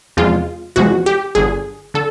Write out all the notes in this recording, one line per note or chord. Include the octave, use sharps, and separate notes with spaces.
E2 C3 F3 G#3 F4
E2 C3 F3 G#3 F#4
G4
G1 G2 D3 G#4
D3 A4